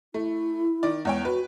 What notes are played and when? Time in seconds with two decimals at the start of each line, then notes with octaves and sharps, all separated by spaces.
0.14 A3 E4
0.83 D#3 D5
1.05 E2 G#3 C#5 G5
1.25 F#4 B4